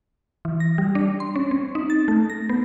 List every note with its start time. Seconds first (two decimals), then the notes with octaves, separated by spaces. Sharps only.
0.45 E3
0.60 A#6
0.78 G3
0.95 D4
1.20 C6
1.36 C#4
1.51 C4
1.75 D#4
1.90 A6
2.08 A3
2.30 A#6
2.49 B3